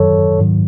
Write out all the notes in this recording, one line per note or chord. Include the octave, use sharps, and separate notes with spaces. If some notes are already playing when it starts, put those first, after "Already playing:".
Already playing: F#2 D#3 F#3 A4 C#5
G#2 D#3 F#3